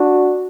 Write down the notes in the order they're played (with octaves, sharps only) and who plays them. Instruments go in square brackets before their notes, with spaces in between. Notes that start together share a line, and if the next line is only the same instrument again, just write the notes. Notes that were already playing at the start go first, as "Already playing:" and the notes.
Already playing: [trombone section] D4 F#4